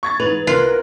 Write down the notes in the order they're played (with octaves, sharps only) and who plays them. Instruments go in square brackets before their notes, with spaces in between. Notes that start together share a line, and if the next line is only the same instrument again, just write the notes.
[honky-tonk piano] C#6 G#6 A6
[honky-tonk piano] G#2 E3 F7 [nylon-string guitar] B4
[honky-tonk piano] C2 F#6 [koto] F4 [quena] A#4